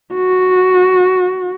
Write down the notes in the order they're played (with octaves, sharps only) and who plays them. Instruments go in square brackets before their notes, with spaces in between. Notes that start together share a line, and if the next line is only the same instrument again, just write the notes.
[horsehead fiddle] F#4